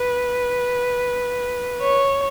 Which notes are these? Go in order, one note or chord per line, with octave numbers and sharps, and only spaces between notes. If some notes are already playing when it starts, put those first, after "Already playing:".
Already playing: B4
C#5